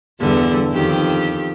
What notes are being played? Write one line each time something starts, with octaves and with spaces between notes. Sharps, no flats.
E2 G2 D3
F2 D#3 G4